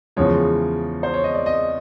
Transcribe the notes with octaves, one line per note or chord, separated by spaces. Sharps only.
E2 C#3 F3 G#3 C#5
C5
C#5
D#5
D5
D#5